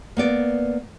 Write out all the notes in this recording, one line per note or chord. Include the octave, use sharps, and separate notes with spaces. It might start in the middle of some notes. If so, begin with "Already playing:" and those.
A#3 B3 D5